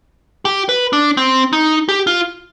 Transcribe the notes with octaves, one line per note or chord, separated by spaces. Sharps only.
G4
B4
D4
C4
D#4
G4
F4